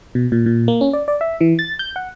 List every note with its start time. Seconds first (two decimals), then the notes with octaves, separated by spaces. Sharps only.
0.15 B2
0.32 A#2
0.46 A#2
0.68 A#3
0.81 C#4
0.93 D5
1.08 D5
1.21 E5
1.41 E3
1.59 A6
1.79 G6
1.96 F#5